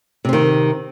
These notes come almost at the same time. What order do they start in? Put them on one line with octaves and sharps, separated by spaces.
C3 C4 D#3